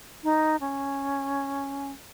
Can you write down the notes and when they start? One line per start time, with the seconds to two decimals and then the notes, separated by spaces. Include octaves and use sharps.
0.24 D#4
0.60 C#4